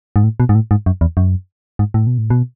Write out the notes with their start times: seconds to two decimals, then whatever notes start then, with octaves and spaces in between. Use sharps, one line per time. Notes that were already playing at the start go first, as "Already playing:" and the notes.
0.16 G#2
0.24 A2
0.40 B2
0.49 G#2
0.55 A2
0.71 G#2
0.86 F#2
1.01 E2
1.17 F#2
1.79 G#2
1.94 A2
2.07 B2
2.18 A2
2.30 B2